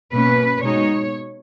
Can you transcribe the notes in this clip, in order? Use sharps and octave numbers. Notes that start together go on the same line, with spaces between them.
B2 A#3 C#4 B4
B2 G#3 D#4 C#5